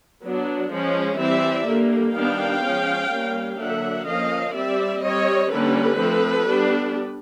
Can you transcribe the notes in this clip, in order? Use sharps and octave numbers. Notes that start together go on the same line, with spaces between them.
F#3 B3 D4
F3 G#3 C#4
E3 G3 C4 D5 E5
D3 G3 A#3
D#3 G3 B3 D4 F5 G5
F3 G#3 C#4
G3 A#3 C#4
D3 F#3 A#3 D4 E5 F#5
F3 A#3 C#4 D#5 F5
G3 C4 D5 E5
G3 C4 C#5 D#5
D3 G3 A#3 C#4 A4 B4
F3 A3 C4
G3 B3 D4